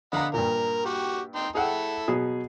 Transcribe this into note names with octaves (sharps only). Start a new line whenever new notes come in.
D3 D#5 F5 F#5 A#5 B5
G2 A#2 A#4
F#4 G4
D#4 G5 C6
E4 G#4 A4 F#5 G5
B2 F#3 G#4